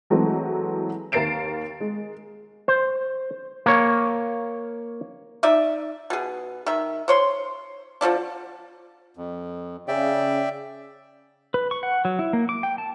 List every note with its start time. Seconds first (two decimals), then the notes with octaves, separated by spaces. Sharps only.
0.10 E3 F#3 G#3 A3 C4
1.12 D#2 A#4 A6 C7 D7 E7
1.81 G#3
2.68 C5
3.66 A#3 C#5
5.43 D#4 D5 E5
6.10 B2 G#4
6.66 D#3 E5
7.08 C5 C#5 C6
8.01 D3 F3 C#4 D4
9.17 F2
9.88 C#3 D5 E5 G5
11.54 B4
11.71 C#6
11.83 F#5
12.05 F#3
12.19 E4
12.33 A#3
12.49 D6
12.63 G5
12.78 A5